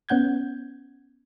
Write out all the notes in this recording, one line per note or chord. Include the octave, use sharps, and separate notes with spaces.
B3 C#4 F#5 G6 G#6